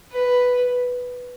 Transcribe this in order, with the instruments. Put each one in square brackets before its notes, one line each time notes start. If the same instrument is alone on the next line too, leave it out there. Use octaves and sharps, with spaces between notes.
[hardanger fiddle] B4